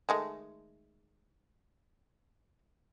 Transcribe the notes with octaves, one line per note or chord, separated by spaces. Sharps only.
D#3 G#3 A3